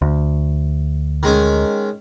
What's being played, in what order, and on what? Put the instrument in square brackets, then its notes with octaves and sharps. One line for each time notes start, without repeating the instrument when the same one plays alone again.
[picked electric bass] D2
[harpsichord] D#3 G#3 C#4